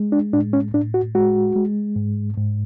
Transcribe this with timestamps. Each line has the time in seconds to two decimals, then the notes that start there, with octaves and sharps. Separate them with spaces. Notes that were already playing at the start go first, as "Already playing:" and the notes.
Already playing: G#3
0.12 D4
0.33 A2 D4
0.53 C#4
0.74 A2 D4
0.94 F#4
1.15 G#3 F#4
1.56 G#3
1.96 G#2
2.37 G#2